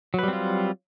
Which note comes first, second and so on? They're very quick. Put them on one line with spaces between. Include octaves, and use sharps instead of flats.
F#3 B4 G3 C4 F4